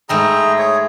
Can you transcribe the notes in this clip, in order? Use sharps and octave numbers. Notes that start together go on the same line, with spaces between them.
G#2 A3 E4 G#4 G5 A#5
G#4 C#5